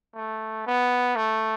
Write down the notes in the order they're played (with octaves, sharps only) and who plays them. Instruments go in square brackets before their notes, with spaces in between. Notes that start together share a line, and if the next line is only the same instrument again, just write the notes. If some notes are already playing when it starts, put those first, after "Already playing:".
[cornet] A3
B3
A3